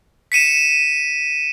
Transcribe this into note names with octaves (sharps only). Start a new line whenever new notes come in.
B6 C#7 D#7 E7